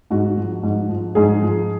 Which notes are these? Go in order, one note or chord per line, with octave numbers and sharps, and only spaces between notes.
G#2 F#4
F3
G#2
F3
G#2 G#4
F3